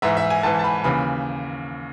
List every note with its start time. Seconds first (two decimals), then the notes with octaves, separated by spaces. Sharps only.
0.02 G#2 E3 E5
0.17 E5
0.30 G#5
0.43 G#2 E3 A5
0.59 A5
0.64 B5
0.84 D#2 C#3 E3 B5